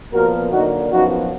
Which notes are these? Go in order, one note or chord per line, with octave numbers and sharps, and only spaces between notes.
A#2 F3 B3 F#4 A#4
D3 F#3 A#3 D#4 F#4
F#2 F3 B3 D#4 F#4